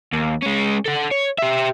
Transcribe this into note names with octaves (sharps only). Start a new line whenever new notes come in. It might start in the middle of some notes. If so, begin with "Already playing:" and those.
D#2
G#3 C#4
A4 F#5
C#5
G4 E5